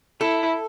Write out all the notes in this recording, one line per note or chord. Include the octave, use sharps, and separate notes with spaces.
E4 A4